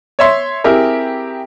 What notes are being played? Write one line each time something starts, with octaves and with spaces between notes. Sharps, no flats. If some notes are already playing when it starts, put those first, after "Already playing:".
C#5 E5 C6
C4 E4 G4 G#4 A#4